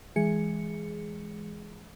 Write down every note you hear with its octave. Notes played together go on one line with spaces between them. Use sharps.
E3 G#3 G#4 C#7